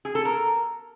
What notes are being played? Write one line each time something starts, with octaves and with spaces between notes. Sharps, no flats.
G#4
A4
A#4